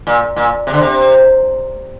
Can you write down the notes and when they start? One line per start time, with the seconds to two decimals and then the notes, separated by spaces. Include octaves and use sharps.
0.07 A#2
0.36 A#2
0.67 C3
0.73 D3
0.81 C3